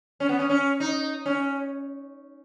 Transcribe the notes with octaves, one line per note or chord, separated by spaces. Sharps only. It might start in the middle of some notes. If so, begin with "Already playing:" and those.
C#4
B3
C#4
C#4
D#4
C#4